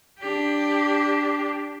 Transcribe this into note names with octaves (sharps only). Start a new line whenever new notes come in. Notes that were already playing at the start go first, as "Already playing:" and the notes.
D4 G4